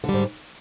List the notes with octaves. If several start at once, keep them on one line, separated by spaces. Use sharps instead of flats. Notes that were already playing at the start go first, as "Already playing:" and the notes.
G#2 D3 G3